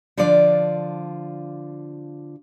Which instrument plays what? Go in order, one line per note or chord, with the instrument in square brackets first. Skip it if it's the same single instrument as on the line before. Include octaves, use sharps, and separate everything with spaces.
[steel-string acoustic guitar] D3 F3 D4 F4 D5